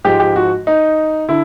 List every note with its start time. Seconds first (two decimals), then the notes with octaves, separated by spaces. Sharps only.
0.04 G#2 F3 G#3 G4
0.20 G4
0.36 F#4
0.67 D#4
1.29 D3 E4